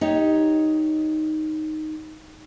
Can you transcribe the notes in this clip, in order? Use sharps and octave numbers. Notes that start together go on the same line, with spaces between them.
D#4 G4 C#5